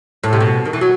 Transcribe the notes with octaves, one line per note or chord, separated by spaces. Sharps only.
A2
C3
B2
D#3
E3
F#3